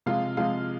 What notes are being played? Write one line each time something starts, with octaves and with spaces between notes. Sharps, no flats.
C3 F3 G#3 F4 F5
C3 F3 G#3 F4 F5